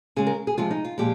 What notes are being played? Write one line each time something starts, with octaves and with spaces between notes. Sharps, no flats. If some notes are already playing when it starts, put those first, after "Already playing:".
C#3 G#3 G#4
A#4
G#4
C3 F3 G#3 F4
D#4
F4
A#2 F3 G#3 G4